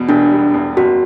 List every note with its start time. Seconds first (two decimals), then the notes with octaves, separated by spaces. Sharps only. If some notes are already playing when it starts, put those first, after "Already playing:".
Already playing: E2 B2
0.09 E1 D4
0.32 G3
0.54 E2
0.77 F#1 F#4